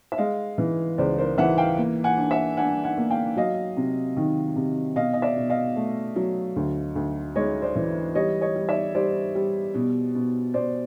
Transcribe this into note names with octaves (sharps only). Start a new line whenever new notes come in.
E5
G#3 D#5 F5
E3
C#2 C5 D5
A#4 C5
E3 E5 F#5
F5 G5
A#3
F#5 G#5
D4
E5 F#5
D4 F#5 G#5
F#5 G#5
A#3
F5 G5
F#3 D#5 F5
C3
D#3
C3
B2 D#5 F5
D#5
D5 E5
B2
D#5 F5
A3
F#3
D2
D2
G#3 C#5 D#5
C5 D5
E3
G3 C#5 D#5
C#5 D#5
G3
D5 E5
G3 C5 D5
G3
B2
B2
B2 C5 D5